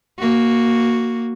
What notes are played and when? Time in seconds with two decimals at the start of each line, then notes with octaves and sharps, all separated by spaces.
0.19 A#3 F#4